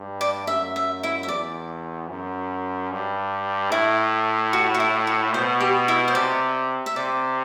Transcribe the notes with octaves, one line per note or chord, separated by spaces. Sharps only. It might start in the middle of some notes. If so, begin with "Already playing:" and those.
Already playing: G2
D5
F#2 E5
E5
E4 E5
E5
E2 D5
F#2
G2
A2 E4
F#4
F#4
E4
F#4
B2 C5
G4
E4 E5
C5
C3 D5
E5
C3 D5